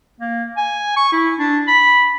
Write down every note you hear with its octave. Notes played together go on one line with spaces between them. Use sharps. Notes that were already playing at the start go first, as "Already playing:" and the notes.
A#3
G#5
C#6
E4
D4
B5